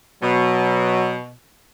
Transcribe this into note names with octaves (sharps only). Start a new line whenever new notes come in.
B2 F#3